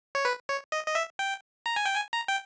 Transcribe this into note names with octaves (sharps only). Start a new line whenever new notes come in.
C#5
B4
C#5
D#5
D#5
E5
G5
A#5
G#5
G5
G#5
A#5
G5